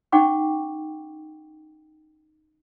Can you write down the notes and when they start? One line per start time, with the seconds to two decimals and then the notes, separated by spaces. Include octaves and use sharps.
0.12 C#4 D#4 F#5 G5 C#6 D6